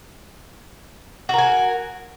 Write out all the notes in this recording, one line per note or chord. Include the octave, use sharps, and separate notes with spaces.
F#4 A#4 G#5